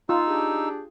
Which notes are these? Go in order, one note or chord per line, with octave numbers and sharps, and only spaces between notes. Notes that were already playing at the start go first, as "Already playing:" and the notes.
D#4 F4 E6
D4 G4 G#4